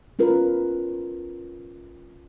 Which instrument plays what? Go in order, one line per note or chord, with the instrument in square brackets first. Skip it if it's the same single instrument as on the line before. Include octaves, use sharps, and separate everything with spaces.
[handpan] C#4 F4 A#4 B4